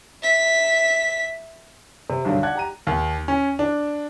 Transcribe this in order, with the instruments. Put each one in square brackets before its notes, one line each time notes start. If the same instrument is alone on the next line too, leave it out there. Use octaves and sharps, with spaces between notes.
[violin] E5 B6
[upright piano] C3
B1 G2 D3 D#3 F#3
D5 F#5 A5 F#6 G#6
G4 A#5 D#7
[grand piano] D#2
C#4
D4